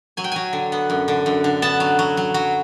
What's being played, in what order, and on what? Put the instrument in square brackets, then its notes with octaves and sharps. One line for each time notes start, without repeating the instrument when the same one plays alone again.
[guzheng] F#3 G#5
G5
F#3 G#5
D3
B3
F#2
D3
F#2
D3
B3 A5
F#3
F#3
F#3
F#3